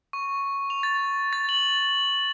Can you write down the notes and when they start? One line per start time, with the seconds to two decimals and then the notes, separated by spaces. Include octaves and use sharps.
0.13 C#6
0.70 F7
0.83 A6
1.33 A6
1.49 F#7